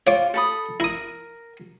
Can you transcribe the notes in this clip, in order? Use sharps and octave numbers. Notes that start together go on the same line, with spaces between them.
F4 C#5 D6
A4 B5 D#6
E4 A#4 D#6